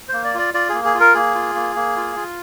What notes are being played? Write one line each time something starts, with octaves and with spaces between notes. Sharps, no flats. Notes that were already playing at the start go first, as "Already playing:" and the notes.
A#3 C5
D5
F4 D5
F4 D5
A#3 G#4
G#4
F4
A#4
A#3 G#4
F4
A#3
A#3
F4
F4